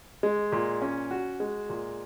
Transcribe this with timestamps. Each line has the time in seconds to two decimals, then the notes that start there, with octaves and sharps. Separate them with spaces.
0.23 G#3
0.52 A#2
0.82 C#4
1.11 F#4
1.40 G#3
1.70 A#2